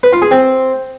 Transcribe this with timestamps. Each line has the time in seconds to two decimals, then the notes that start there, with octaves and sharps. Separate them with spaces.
0.03 B4
0.13 F4
0.22 G#4
0.31 C4